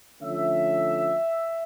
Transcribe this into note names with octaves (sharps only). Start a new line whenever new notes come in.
D3 F3 A3 C#4 E5